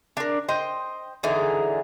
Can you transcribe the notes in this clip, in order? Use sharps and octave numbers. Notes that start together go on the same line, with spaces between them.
D4 A#4
C5 D#5 G5
D3 E3 D#4 G#4